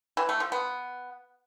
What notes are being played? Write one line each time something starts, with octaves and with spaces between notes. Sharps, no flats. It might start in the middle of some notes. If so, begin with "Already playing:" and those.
E3
A3
F3
B3